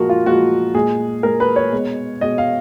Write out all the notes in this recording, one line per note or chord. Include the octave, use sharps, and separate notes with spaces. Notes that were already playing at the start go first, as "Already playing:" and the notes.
Already playing: A#2 F3 G#3 F#4 A#4
F4
A#2 F3 G#3 F#4
A#2 G#3 G#4
A#2 G#3 A#4
B4
C#5
B2 G#3
B2 G#3 D#5
F5